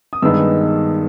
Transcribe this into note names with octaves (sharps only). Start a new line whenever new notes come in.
D#6
G2 D#3 G#3 B3 D#4 E6